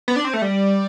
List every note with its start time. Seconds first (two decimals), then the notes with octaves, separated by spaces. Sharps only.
0.08 B3
0.16 D4
0.25 C4
0.34 A3
0.42 G3